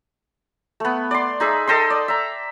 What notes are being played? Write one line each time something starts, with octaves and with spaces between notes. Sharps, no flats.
A3 B3
D5 C6
D#4 G#4 E5
A4 D#5 G5 C6
D5
E5 A#5